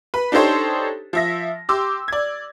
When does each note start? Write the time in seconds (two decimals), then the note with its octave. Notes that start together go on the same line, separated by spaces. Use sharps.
0.14 B4
0.32 D4 D#4 G4 A4 C5 C#5
1.13 F3 E5 A#6
1.69 G4 C6 D6 E6
2.08 D5 G#6